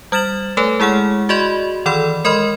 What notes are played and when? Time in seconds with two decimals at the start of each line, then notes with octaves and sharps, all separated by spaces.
0.12 G3 F6 A6 E7 F#7
0.57 A3 A4 B4 C#5 G#5
0.80 G#3 E4 G#4 F#5 F6
1.29 F#4 G#4 D5 D#5 B5 C6
1.86 D#3 E3 A4 D5 B5 E6
2.24 G#3 A#4 D#5 B5 C6 F6